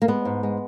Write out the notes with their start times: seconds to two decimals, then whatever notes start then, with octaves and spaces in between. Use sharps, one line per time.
0.02 A#3
0.08 G#3 B3
0.25 G#2
0.43 G#3